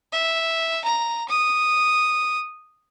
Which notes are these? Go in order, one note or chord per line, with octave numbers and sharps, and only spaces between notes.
E5
A#5
D#6